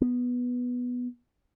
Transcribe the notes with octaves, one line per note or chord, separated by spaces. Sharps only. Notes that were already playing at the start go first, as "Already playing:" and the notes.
B3